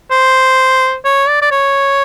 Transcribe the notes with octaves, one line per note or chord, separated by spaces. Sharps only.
C5
C#5
D5
D5
C#5